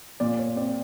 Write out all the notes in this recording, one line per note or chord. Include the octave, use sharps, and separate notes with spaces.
A#2 D5
C#5
C4 D5